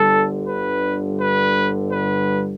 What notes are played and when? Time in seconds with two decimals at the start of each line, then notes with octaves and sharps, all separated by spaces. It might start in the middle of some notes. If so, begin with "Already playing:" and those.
Already playing: G1 G2 D3 G3 A4
0.48 B4
1.20 B4
1.92 B4